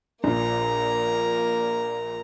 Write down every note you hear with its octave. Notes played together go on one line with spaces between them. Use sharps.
A#1 A#2 A#3 A#5